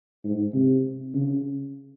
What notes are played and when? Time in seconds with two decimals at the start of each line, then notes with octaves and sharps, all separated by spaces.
0.24 G#2
0.54 C3
1.14 C#3